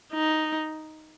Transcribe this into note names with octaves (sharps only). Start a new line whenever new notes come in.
D#4